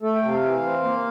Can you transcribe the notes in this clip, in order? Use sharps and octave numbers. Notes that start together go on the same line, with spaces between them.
A3 A4
G5
C3
F5
E3
C4
A#3